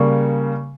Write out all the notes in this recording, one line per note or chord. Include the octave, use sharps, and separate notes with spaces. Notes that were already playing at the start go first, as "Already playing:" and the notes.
Already playing: C#3 G3 A#3 C#6